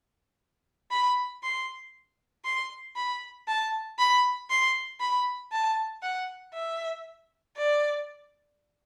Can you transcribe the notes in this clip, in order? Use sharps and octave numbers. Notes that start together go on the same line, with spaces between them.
B5
C6
C6
B5
A5
B5
C6
B5
A5
F#5
E5
D5